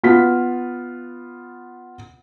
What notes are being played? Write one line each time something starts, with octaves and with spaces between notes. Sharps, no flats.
B3 F4 B6